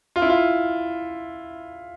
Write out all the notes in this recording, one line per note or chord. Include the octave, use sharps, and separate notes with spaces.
F4
E4
F4